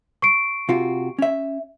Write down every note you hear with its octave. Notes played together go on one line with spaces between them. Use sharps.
C#6 C7 D7
C3 F4 F#4
C#4 E5